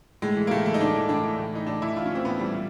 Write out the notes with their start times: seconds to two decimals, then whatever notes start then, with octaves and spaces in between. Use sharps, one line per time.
0.22 A2 G#3
0.37 E3
0.47 A#3
0.51 A2 A3
0.66 E3 A3
0.74 D#4
0.80 A2 D4
0.95 E3
1.09 A2 D4
1.24 E3
1.38 A2
1.53 E3 D#4
1.67 A2 D4
1.82 E3 E4
1.96 A2 F4
2.06 C#4
2.10 E3 C4
2.25 A2 B3
2.40 E3 G3
2.54 A#2